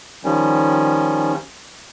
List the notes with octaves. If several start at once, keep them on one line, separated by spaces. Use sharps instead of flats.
D#3 F3 G3 C#4